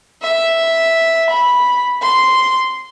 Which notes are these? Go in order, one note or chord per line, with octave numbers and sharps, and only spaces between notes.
E5
B5
C6